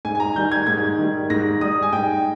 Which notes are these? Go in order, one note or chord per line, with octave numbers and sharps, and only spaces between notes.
G#2 G#5
G#5
A#5
D#3 G3 G6
G#6
G#2 G#6
D#3 G3
G#2 A#6
G3 D#6
G#5
G#2 G5